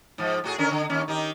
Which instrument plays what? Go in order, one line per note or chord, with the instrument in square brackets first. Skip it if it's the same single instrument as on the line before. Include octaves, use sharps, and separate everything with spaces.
[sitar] G#2 F3
A2 F#4 G#4
D3 C#4 A#4
D3
D#2 C#4
D#3 D#4 G4